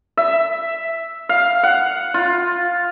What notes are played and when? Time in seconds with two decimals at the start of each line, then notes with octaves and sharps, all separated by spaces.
0.17 E5
1.29 F5
1.63 F#5
2.14 F4